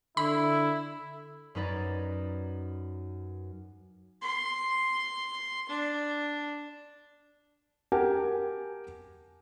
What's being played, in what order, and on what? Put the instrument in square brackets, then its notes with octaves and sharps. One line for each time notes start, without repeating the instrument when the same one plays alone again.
[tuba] D3 [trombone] E4 [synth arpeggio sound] B5
[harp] F#2 C#4 D#4 B4 D5 A6
[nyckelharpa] C6
D4
[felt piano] G4 A#4 F#5 G#5 A5